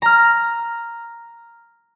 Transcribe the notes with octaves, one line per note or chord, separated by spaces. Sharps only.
A#5 F6